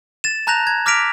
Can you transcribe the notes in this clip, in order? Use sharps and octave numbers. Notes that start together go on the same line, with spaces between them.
A6 E7
A5 A#5 F#6 G6 A#6 F7
G#6
D6 F6 A#6 B6 D7 F7